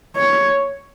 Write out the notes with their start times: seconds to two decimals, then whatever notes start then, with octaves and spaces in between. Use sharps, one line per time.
0.16 C#5